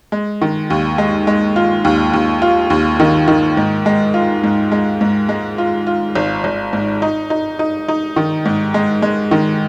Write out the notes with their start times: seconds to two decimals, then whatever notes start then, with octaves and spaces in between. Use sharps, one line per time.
0.12 G#3
0.42 D#3
0.70 D#2
0.98 G#3
1.27 G#3
1.56 F4
1.85 D#2
2.13 D#2
2.42 F4
2.70 D#2
3.00 D#3
3.28 D#3
3.57 G#2
3.86 G#3
4.14 F4
4.43 G#2
4.72 G#3
5.01 G#2
5.29 G#3
5.58 F4
5.87 F4
6.15 G#1
6.44 G#1
6.73 G#2
7.02 D#4
7.30 D#4
7.59 D#4
7.88 D#4
8.16 D#3
8.45 G#2
8.74 G#3
9.02 G#3
9.31 D#3